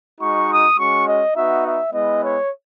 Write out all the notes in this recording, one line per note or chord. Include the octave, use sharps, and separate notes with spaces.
G#3 D#4 F#4 C#6
D#6
G#3 C#4 F#4 C#6
D#5
B3 D#4 F#4 E5
E5
G#3 B3 E4 D#5
C#5